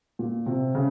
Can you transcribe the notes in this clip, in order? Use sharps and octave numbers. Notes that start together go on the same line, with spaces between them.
A#2
C3
C#3